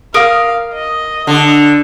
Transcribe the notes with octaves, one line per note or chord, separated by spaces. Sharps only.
A#4 F5 D6 D#6
D#5
D3